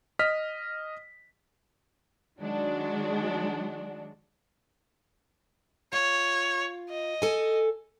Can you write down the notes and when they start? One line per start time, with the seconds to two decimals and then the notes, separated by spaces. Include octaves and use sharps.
0.19 D#5 F6 B6
2.38 D#3 F#3 G#3 D4 F#4
5.93 F4 C#5
6.89 D#5
7.22 A4 G#5